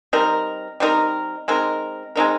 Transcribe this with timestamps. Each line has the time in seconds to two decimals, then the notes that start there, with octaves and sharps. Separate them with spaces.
0.13 G3 C4 D#4 A#4
0.80 G3 C4 D#4 A#4
1.48 G#3 C4 D#4 A#4
2.16 G#3 C4 D#4 A#4